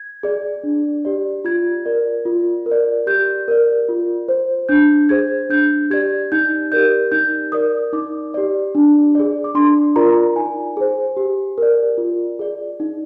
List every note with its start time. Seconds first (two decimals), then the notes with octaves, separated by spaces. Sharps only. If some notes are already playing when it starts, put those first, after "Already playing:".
Already playing: G#6
0.23 G#4 D5
0.64 D4
1.05 G4 D5
1.45 F4 G#6
1.86 A#4 D5
2.26 F4
2.66 A#4
2.71 D5
3.07 G4 G6
3.48 A#4 D5
3.89 F4
4.28 C5
4.69 D4 G6
5.09 G#4 C5 G#6
5.50 D4 G6
5.90 G4 D5 G#6
6.32 D#4 G6
6.72 G4 A#4 D5 G6
7.12 D#4 G6
7.52 A#4 D5 D#6
7.93 D#4 D6
8.34 G4 D5
8.75 D4
9.15 G#4 D5
9.44 D6
9.55 D4 C6
9.96 F4 A#4 D5 A#5
10.36 D#4 G#5
10.77 G#4 C5
11.17 G4
11.58 A#4 D5
11.98 F4
12.39 G#4 D5
12.80 D#4